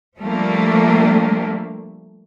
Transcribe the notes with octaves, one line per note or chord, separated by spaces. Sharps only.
F3 G3 A3 A#3 D4